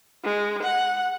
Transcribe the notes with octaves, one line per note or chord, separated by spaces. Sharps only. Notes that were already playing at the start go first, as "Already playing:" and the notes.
G#3
F#5